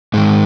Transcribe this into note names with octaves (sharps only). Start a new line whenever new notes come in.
G#2 D#3 G#3